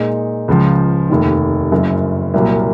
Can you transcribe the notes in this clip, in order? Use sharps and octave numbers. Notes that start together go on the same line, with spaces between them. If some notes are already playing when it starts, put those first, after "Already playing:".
Already playing: A#2 G#3 D#4
C#2 C#3 F3
F1 D#2 D#3
F#1 F#2 C#3
C2 A#2 F#3 A#3